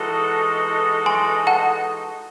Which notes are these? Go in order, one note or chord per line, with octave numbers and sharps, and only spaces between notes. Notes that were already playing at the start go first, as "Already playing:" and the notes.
Already playing: E3 G#3 D#4 F#4 A4
G#5 C6
F#5 A5